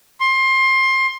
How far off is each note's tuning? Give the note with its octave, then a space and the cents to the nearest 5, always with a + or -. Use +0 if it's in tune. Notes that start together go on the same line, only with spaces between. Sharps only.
C6 +25